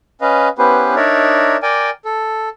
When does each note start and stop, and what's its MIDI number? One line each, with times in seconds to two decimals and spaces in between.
0.21 0.49 61
0.21 0.49 71
0.21 0.49 75
0.21 0.49 77
0.58 0.95 59
0.58 0.95 61
0.58 0.95 64
0.58 0.95 67
0.58 0.95 71
0.58 0.95 72
0.96 1.57 62
0.96 1.57 63
0.96 1.57 70
0.96 1.57 73
0.96 1.57 74
0.96 1.57 76
1.62 1.90 70
1.62 1.90 74
1.62 1.90 79
1.62 1.90 80
1.62 1.90 86
2.05 2.49 69